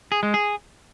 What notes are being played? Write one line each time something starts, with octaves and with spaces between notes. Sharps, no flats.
G#4
G#3
G#4